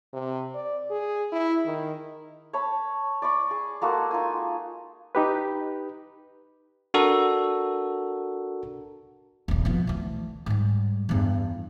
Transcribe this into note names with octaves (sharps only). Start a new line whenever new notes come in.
C3
D5
G#4
E4
D#3
C#5 A5 B5
D5 B5 C#6
G#4
G#3 A#3 F#4 A4
D#4 F4 G#5
D#4 G4 B4
D4 F#4 A4 A#4
D#1 G#1
B2 F3
D2 E3
G#2 G3
E2 G2